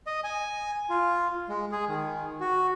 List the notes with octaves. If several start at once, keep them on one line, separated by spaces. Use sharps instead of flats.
D#5
G#5
F4
G#3
G#4
D#3
F#4